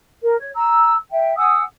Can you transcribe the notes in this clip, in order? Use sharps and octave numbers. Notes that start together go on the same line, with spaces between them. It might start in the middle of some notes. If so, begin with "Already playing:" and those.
A#4
C#5
A#5 E6
E5 G5
F#5 G#5 D#6 E6